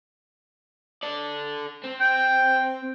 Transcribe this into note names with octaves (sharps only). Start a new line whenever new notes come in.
A4 D5
C4
G5